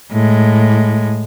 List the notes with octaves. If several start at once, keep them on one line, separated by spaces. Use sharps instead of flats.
A2 G#3